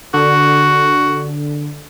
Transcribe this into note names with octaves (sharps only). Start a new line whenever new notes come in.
D3 F#4